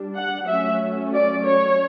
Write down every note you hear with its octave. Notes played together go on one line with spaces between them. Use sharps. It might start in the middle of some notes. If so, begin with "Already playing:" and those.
Already playing: G3 D4
F#5
F#3 A3 C#4 E5
D5
C#5